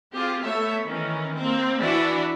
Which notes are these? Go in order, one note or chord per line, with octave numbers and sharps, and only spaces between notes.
C4 F4 G4 G#4
A3 B3 A4 C#5 E5
D#3 E3 C#4
A#3 C4
E3 D4 E4 F#4 B4 D5